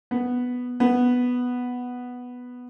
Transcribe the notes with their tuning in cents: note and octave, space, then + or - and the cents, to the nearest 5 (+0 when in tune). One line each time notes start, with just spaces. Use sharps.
B3 +0
B3 +0